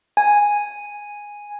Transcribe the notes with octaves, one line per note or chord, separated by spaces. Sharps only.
G#5